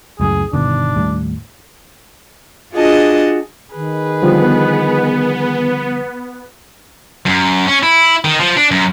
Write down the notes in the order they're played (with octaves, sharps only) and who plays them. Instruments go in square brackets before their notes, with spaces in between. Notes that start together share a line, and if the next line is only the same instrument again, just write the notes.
[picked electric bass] C#2 F#2 A2 [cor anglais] G#4
[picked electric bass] G1 B2 D#3 [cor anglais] D4
[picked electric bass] D#2 A2 G3
[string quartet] D4 F4 F#4 G#4 D#5 A5
[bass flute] D#3 [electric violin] G#4 B4
[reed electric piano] D3 F3 G3 [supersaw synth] B3
[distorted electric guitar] F#2
C#4
E4
D#3
F3
D4
F#2